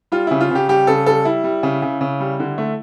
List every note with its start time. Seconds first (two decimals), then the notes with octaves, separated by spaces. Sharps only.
0.12 G3 F4
0.27 C#3 E4
0.41 F4
0.51 C#3 G4
0.68 G3 G4
0.87 C#3 A4
1.06 G3 A4
1.25 G3 E4
1.44 G3
1.63 C#3
1.82 C#3
2.01 C#3
2.20 G3
2.39 D3
2.58 A3